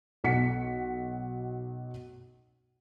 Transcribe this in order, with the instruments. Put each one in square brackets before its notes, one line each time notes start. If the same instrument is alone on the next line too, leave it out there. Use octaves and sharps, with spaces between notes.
[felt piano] B1 F#5 B6 C#7